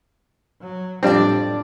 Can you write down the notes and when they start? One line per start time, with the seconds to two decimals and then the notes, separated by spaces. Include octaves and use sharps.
0.61 F#3
1.03 F2 A2 G3 C4 D4 D5